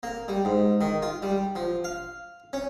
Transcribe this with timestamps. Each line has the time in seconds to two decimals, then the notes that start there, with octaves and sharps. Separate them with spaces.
0.03 A#3
0.28 G3
0.45 G#2
0.81 D#3
1.02 F4
1.22 G3
1.55 F3
1.84 F5
2.53 C#4